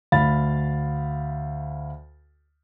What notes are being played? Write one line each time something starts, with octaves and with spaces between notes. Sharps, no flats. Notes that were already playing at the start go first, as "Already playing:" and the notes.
D2 F5 B5 A6